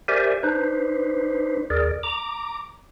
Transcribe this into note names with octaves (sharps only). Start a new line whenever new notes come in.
G4 A#4 C5 D5 E5 G#5
D4 D#4 B4 C5
D#2 G#4 A#4 D5
A#5 D6